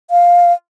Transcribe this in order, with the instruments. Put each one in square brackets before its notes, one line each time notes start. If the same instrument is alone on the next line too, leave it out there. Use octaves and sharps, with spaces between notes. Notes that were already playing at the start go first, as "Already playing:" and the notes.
[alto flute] F5